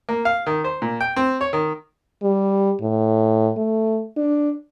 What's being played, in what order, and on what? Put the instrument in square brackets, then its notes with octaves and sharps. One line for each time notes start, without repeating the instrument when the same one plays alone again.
[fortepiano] A#3
F5
D#3
C5
A#2
G5
C4
C#5
D#3
[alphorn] G3
A2
A3
D4